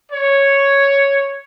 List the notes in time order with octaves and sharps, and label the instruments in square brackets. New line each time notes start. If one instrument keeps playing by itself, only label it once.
[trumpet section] C#5